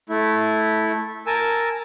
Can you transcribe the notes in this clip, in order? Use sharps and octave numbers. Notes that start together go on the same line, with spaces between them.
A3 E4
A#4 G#5 A5 E6